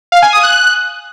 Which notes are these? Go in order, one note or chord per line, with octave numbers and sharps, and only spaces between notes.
F5
G#5
D#6
F#6